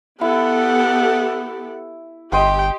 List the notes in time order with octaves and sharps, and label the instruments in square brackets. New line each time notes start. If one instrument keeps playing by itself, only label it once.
[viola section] B3 G4 A4 [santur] E4 [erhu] F#5
[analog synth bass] G1 [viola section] G4 [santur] D#5 C6 D#6 [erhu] G5